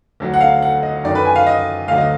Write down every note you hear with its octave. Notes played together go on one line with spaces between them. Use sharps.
D2 D3 F#3
F#5
F5
F#5
D#5
F#2 D#3 F#3 D5
B4
G#5
F5
D#5
D2 D3 F#3 F5
D#5